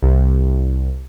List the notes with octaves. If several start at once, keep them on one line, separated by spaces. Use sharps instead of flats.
C2